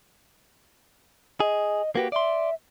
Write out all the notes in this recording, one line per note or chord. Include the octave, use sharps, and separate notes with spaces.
G#4 D#5
A#3 F#4 G4 B4
D5 E5 C6